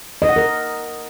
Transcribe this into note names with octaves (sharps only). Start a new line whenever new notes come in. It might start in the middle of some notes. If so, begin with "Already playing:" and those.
D#5
F#5
A#4